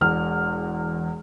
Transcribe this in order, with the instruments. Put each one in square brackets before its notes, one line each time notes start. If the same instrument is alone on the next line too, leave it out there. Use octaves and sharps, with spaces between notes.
[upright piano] E1 E2 F6